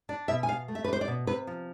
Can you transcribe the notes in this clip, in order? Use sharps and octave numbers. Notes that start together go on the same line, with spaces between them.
D4 D5
B2 E5
G#5
B2 F5
A3
E5
B4
D4 C5
D5
B2
C3 B4
F3